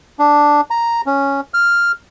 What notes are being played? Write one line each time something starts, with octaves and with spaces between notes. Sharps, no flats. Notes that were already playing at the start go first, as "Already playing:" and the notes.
D4
A#5
C#4
F6